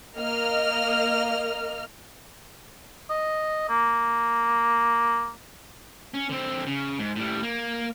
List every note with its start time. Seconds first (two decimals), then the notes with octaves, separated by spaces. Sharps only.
0.16 A#3 D#5 F6
3.10 D#5
3.69 A#3
6.14 C#4
6.29 D3 C4
6.66 C#3
6.99 G#2
7.16 A2 G3
7.43 A#3